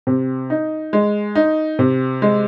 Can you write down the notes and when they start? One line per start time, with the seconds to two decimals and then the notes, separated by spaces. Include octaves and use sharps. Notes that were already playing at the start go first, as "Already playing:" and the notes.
0.07 C3
0.50 D#4
0.93 G#3
1.35 D#4
1.79 C3
2.22 G#3